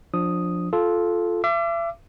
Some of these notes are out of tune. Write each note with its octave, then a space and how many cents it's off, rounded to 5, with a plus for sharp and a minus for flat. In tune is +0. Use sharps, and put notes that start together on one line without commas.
F3 +15 D4 +0 D#6 +0
F4 +0 A4 -15
E5 +40 D6 +0